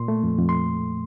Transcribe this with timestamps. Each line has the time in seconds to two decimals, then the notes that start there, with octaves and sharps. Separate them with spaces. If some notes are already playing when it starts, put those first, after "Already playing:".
Already playing: A#2 C6
0.08 A3
0.23 F2
0.39 F2
0.49 C6